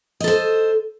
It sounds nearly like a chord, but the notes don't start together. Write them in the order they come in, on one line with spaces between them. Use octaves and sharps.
D#5 A4 C5